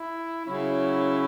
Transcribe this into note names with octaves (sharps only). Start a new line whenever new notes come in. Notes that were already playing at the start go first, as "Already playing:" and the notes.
Already playing: E4
C#3 F#3 C#4 E4